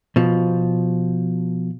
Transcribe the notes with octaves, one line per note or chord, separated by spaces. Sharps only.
B2 F3